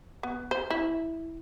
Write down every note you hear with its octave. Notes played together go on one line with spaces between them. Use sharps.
B3
C5
E4